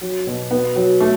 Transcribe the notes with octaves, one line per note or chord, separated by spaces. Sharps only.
F#3
B2
B3
F#3
A3